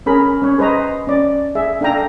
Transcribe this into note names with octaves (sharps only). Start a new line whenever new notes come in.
C#4 G#4 A#4 B5
C#4 C#5
G#4 B4 C5 D#5 A#5
C#4 D5
G#4 E5
D4 A4 F5 G5 A#5